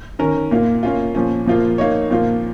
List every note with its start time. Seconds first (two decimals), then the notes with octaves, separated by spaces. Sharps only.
0.19 D#3 C#4 A#4
0.51 A#2 A#3 F4
0.83 A#3 C#4 F4
1.15 A#2 F3 C#4
1.46 A#2 F3 A#3 F4
1.78 A#2 A#3 D#4 C#5
2.10 A#2 F3 A#3 F4